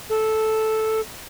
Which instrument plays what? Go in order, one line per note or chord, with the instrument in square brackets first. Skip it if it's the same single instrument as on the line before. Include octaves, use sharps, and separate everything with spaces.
[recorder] A4